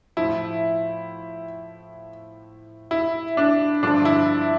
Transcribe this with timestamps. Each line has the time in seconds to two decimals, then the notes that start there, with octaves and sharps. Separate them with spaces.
0.17 A2 F3 E4
2.91 E4
3.37 D4
3.83 G2 D3 F3 D4
4.05 E4